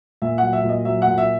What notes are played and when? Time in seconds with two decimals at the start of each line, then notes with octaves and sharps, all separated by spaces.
0.22 A#2 E5
0.38 F#3 F#5
0.53 E5
0.64 A#2
0.69 D#5
0.85 F#3 E5
1.02 F#5
1.07 A#2
1.18 E5